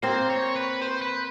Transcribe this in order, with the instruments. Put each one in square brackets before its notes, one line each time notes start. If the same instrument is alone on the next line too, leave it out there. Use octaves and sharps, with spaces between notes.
[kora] A#3 C4 [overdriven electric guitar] C5
[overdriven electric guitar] C#5
B4
C5
B4